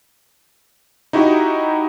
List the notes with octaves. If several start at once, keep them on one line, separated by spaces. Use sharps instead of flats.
D#4 E4 F#4 G4